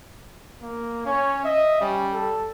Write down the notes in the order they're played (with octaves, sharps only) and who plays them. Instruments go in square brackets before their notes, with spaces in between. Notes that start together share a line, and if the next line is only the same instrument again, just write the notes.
[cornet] A#3
[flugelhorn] C#4 [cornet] C#5
[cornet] D#5 [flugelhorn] E5
[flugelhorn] G3 [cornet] C#4
[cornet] A4